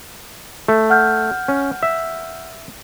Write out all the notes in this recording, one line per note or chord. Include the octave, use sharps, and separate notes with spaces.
A3
F#5 F6 G6
C#4
E5